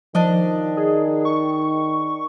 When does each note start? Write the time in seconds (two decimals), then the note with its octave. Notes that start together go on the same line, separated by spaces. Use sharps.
0.15 D#3 F3 D4 D#5
0.77 G#4
1.25 C#6